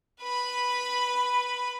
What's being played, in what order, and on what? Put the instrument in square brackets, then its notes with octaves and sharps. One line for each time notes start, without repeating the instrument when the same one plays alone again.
[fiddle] B4 B5